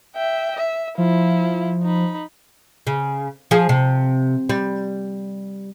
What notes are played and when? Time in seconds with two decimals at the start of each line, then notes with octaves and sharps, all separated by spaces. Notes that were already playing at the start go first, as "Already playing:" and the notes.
0.15 E5 G5
0.56 E5
0.98 F3 E4 F4
1.83 D#4 B5
2.87 C#3
3.51 F3 G#4
3.69 C3
4.49 G3